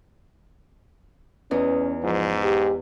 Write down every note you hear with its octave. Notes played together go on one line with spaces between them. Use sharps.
E2 C#4 D#4 B4
G#2 F3
G4